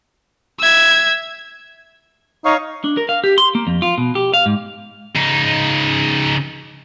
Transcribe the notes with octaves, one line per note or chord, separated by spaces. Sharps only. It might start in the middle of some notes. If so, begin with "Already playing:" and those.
E5 G#6
D#4 C#5 F5 C#6
D4
A#4
F5
G4
C6
A#3
F2
F4
B2
G4
F5
G#2
C#3 D#4